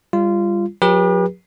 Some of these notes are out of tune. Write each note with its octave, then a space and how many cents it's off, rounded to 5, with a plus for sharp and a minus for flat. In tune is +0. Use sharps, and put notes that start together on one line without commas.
G3 +25 F4 -20
F#3 -35 G4 +35 B4 -40